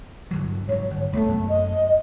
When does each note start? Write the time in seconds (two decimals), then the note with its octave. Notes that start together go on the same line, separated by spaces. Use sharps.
0.31 G1 D3 F#3
0.69 G#2 F#3 C#5
0.90 G1
1.13 C2 A3 B3
1.28 F#2
1.49 D#5